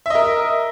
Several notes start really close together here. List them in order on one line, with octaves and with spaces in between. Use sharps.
E5 D#5 A#4